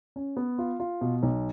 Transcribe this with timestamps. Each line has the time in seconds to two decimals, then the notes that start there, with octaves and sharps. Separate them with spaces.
0.16 C#4
0.37 B3
0.59 F4
0.80 F4
1.01 B2
1.23 B1